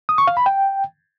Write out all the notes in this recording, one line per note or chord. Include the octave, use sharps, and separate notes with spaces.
D#6
C#6
F5
B5
G5